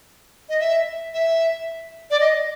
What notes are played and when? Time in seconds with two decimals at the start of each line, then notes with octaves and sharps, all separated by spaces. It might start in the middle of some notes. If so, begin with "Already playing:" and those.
0.49 D#5
0.60 E5
1.14 E5
2.11 D5
2.20 D#5